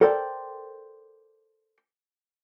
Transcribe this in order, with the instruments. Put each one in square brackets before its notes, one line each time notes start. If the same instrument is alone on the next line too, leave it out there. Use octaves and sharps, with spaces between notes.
[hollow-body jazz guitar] A4 A#4 C5 D5 G5